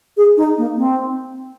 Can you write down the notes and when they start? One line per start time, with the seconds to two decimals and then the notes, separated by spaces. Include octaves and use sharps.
0.17 G#4
0.37 D#4
0.58 A#3
0.77 C4